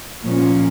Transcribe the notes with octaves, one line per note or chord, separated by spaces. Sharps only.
A#2 F3 A#3 C#4